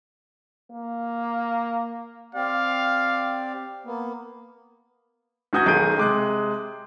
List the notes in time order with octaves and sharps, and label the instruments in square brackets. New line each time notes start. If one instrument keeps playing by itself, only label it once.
[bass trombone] A#3
[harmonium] C4 G4 D5 [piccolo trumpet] F5
[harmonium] A#3 B3
[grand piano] E2 E3 F#4 D#6 G6 G#6
B1 D#3 G#4 G6 D7 D#7
C3 G#3 D6 F#6